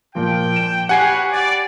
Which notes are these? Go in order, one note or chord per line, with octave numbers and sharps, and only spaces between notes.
A#2 F3 G5
E7
F#4 G4 B4 C#5 F#5 G#5 C7
D5